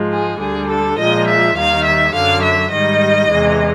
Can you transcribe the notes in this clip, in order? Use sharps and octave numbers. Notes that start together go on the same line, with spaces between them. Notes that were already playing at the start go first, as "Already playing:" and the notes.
Already playing: G#2 F3 G#3
G#4
D2 D3 G3 G#4
A4
A#2 F3 G#3 D#5
E5
D#2 D#3 G3 F5
E5
F#2 D3 F#3 F5
E5
G#2 D#3 G3 D#5
E2 C3 E3 G#3